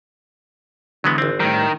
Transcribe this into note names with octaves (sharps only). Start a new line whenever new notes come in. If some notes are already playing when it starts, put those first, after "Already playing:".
D3 E3 F#3 G#3 B3
G#1 C4
A2 D#3 G3